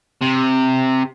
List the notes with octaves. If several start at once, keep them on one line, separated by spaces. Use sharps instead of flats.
C3